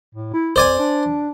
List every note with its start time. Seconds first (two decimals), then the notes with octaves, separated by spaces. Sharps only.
0.15 A2
0.33 E4
0.56 F2 C5 D5 G#5
0.79 D4